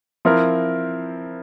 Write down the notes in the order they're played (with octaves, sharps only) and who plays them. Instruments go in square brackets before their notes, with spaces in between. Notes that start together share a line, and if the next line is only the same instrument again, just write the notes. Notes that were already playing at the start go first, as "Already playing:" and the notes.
[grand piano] F3 C4 E4 A#4